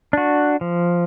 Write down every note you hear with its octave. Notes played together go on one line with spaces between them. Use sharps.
D4 F#4
F3